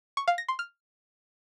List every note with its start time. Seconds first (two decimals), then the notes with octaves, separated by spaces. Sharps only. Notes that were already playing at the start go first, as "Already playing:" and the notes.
0.17 C#6
0.28 F5
0.38 A#6
0.48 C6
0.59 F6